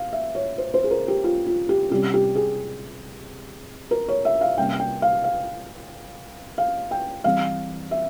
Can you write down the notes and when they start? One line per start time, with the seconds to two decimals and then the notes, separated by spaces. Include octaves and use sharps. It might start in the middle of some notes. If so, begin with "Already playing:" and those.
Already playing: F5
0.13 E5
0.35 C#5
0.58 C5
0.74 C5
0.84 G#4
0.91 A#4
1.08 G4
1.24 F4
1.47 F4
1.69 G4
1.90 C3 G3 C#4 G4
2.14 G4
2.35 G#4
3.91 A#4
4.08 C#5
4.25 E5
4.41 F5
4.57 C3 G3 A#3 C#4 G5
4.80 G5
5.02 F5
5.24 F5
6.58 F5
6.91 G5
7.24 E3 G3 C4 F5
7.91 E5